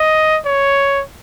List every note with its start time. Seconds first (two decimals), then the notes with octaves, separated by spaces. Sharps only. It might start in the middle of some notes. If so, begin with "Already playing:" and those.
Already playing: D#5
0.45 C#5